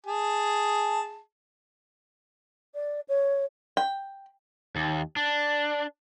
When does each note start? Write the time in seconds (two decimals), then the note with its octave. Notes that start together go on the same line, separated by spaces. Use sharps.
0.06 G#4 A5
2.74 D5
3.08 C#5
3.77 G5
4.76 D#2
5.17 D4